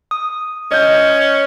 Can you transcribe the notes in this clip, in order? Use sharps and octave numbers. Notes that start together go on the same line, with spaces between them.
D#6
C#4 D#5 G6